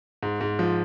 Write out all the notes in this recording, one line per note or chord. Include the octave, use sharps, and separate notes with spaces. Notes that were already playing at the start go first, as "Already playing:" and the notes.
G#2
G#2
F3